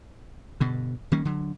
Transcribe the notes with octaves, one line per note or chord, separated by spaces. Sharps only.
G2 B2 D3
D#3 G3 A#3 C#4
D3 F#3